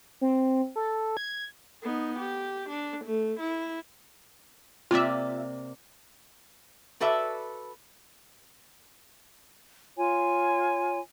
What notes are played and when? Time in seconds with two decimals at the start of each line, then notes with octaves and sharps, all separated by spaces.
0.21 C4
0.76 A4
1.17 G#6
1.83 B3 D#4
2.19 G4
2.69 D4
3.04 A3
3.39 E4
4.91 C3 A#3 F4 D5 E5
7.00 F#4 A4 B4 D5 E5
9.97 F4 C#5 G#5